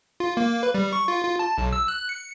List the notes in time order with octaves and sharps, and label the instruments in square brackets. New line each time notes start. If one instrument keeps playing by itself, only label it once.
[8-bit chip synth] F4
A#3
B4
G3
C#6
F4
F4
A5
B1
E6
F#6
C#7